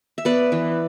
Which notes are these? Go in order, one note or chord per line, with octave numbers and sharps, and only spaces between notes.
E5
B3 B4 D5
E3